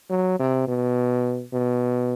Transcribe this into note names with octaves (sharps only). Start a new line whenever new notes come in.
F#3
C3
B2
B2